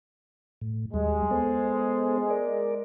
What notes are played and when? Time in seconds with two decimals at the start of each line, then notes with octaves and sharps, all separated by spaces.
0.61 A2
0.94 D#2 G3 G#3
1.31 B3 A4 C5
2.30 A#4 D5